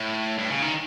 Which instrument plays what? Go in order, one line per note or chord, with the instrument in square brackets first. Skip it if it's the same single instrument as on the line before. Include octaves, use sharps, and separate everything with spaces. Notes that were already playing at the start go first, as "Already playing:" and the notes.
Already playing: [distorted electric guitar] A2
G2
C#3
D#3